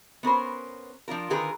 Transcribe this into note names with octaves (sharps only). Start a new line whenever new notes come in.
B3 C#4 A#4 C5
F3 D4 F4 A#4
D3 D#3 F4 G#4 A#4 B4